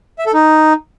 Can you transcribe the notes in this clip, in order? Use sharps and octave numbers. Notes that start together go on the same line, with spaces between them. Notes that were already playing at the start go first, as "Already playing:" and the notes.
E5
A4
D#4